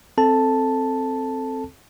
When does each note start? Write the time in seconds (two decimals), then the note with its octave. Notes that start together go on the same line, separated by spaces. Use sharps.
0.18 C4 A4 A5